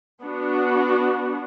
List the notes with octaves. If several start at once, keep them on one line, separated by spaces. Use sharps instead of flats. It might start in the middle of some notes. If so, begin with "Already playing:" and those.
B3 D4 F#4